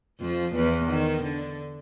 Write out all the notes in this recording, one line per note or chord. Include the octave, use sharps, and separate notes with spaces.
F2 F3
E2 E3
D#3
D3